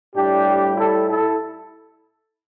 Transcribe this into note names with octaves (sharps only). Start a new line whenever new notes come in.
A2 G3 D4 G4
E4 A4
E4 A4